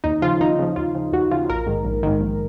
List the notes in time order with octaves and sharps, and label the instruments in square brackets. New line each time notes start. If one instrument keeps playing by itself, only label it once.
[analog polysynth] D#2 D#4
C#3 F3 F4
D#2 D#4
C#3 F3
D#2 F4
C#3 F3
D#2 F#4
C#3 F3 F4
A#1 A#4
G#2 D#3
A#1
G#2 D#3
A#1